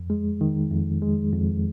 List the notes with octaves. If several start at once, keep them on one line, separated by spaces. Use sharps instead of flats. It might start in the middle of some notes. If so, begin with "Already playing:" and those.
Already playing: F2
G#3
D#3
F2
G#3
F2